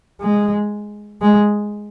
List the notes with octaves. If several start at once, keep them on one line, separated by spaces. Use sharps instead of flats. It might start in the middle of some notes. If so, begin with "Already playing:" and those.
G#3
G#3